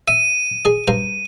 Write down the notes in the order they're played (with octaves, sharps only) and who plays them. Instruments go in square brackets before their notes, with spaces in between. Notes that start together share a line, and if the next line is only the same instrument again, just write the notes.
[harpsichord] E5 [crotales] D#7
[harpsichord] G#4 D#5
G2 C5 A#5